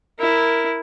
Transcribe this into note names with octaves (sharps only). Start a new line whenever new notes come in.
E4 A#4